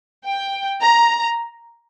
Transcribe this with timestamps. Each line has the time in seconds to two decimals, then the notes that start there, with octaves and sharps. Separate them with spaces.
0.25 G5
0.82 A#5